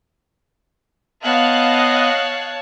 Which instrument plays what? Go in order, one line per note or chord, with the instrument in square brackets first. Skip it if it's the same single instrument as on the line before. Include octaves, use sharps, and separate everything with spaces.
[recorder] B3 [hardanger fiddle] C#5 A5 [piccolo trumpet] D#5 [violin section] F5 F#6